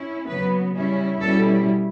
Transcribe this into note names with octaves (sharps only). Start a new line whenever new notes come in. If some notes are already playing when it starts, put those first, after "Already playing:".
Already playing: C#4 E4
C#3 F#3 B3 B4
C#3 G3 C#4 E4
B2 G3 C#4 E4 A4